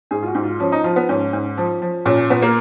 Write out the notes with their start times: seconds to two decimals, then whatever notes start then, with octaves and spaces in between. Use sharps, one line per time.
0.11 G#2 G#4
0.23 F4
0.27 F#4
0.35 G#2
0.43 F4
0.60 F3 C#4
0.72 D#4
0.84 F3 F4
0.96 B3
1.09 G#2 C#4
1.33 G#2
1.57 F3
1.82 F3
2.06 A#2 C#4
2.18 C#4
2.30 A#2 B3
2.42 A#3